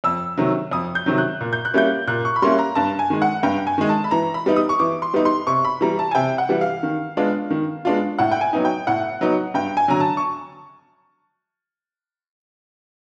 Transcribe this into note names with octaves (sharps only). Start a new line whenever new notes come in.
F2 E6
C3 D#3 F#3
F2 D#6
G6
C3 D#3 F#3
F#6
A#2
G6
F#6
G3 A#3 C#4 E4 G6
A#2 F#6
C#6
B5
G3 A#3 C#4 E4 C6
A#5
G2 A5
G#5
D#3 G#3
F#5
G2 G5
G#5
D#3 G#3
A5
B5
E3 A#5
B5
G3 B3 D#4
D#6
C#6
E3 D6
C6
G3 B3 D#4
C6
C3 C#6
B5
E3 G3 A#5
A5
G#5
C3 G5
F#5
E3 G3
F5
D#3
G#3 B3 D4 F4
D#3
G#3 B3 D4 F4
A2 F#5
G5
G#5
F#3 B3 D#4
G5
A2 F#5
F#3 B3 D#4
G2 G5
G#5
D3 F#3 A#5
A5
C#6